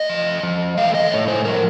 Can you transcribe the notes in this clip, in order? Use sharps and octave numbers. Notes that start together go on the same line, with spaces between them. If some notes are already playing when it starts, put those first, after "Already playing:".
Already playing: A3 D#5
F3
F3
A3 F5
D#5
A2 C#5
C5
F3 A#4